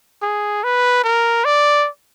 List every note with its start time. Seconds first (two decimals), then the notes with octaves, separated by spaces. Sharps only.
0.22 G#4
0.64 B4
1.04 A#4
1.45 D5